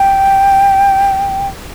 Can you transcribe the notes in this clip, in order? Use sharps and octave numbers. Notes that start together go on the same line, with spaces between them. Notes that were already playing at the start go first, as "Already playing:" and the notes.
Already playing: G5